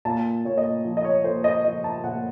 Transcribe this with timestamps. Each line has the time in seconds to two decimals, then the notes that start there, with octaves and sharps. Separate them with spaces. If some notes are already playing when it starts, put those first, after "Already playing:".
0.05 A#2 A5
0.45 A#2 C#5
0.58 D#5
0.84 F3
0.97 D#5
1.05 C#5
1.24 A#2 C5
1.44 D#5
1.64 F3 D#5
1.84 A5
2.04 A#2 F#5